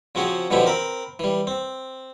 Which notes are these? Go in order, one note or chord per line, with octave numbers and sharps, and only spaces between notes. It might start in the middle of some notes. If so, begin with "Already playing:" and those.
C#3 F3 C4 F#4 G#4
B2 D3 E3 F3 E4 G4
C4 A#4 B5
E3 G3
C4